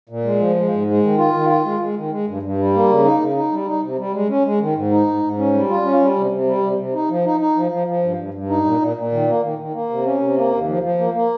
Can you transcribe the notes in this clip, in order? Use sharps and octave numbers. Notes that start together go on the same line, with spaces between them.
A#2
G#3
F3
G#3
G#2
G#3
D#3
F4
D#3
F4
G#3
G#3
D#3
G#3
G2
G2
G3
A#3
C#3
D#4
C#3
D#4
G3
D#4
C3
G3
G#3
C#4
G#3
D#3
G#2
D#4
G#2
G#2
C#4
G3
F4
C#4
G3
C3
C3
G3
C3
C3
D#4
F3
D#4
D#4
F3
F3
F3
G2
G2
G2
D#4
A#2
A#2
A#2
D#3
A#3
D#3
D#3
A#3
C3
C#4
C3
A#3
D#2
F3
F3
A#3
A#3